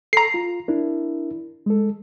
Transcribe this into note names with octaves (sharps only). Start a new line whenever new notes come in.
A4 A#5 C7
F4
D4 E4 A#4
G#3 A4